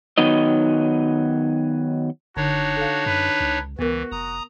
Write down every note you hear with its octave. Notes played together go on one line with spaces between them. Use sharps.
D#3 F#3 B3 D#4 D#5
F#1 D3 D4 D#4 F#4 C#5
A4 F5
F#2 B4
C#2
C#2 E3 B3 F#4 A#4
F1 A#5 D#6